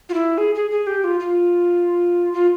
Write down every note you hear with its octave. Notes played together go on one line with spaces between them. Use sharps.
F4
E4
G#4
G#4
G#4
G4
F4
F4
F4